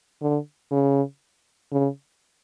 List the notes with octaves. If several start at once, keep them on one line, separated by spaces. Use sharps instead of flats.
D3
C#3
C#3